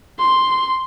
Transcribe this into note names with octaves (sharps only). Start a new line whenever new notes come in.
C6